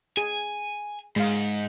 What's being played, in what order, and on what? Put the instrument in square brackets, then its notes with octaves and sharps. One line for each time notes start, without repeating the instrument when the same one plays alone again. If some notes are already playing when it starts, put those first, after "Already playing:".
[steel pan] G#4 [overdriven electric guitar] G#5
[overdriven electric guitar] G#2 [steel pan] G#3 F5